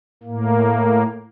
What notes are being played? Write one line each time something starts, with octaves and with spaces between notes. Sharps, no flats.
A2 A#3